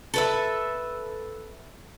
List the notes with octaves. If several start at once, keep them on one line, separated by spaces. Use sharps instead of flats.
A4 B4 E5